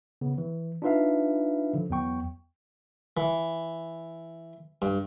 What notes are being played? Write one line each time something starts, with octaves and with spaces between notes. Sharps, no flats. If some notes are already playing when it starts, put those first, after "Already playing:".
C#3 B3
E3
D4 D#4 F4 B4 E5 F5
D3 F3
E2 F#3 B3 G5 C#6
E3
G2